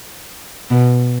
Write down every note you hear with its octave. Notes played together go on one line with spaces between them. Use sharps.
B2